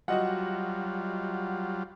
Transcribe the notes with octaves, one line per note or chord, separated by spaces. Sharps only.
F#3 G3 F4 F#4 D#5 F#5